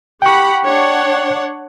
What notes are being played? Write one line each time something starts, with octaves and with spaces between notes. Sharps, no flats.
G4 F#5 G5 B5 C#6
D4 C#5 F#5